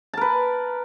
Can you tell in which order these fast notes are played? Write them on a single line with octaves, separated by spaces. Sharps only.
A5 A#4 B4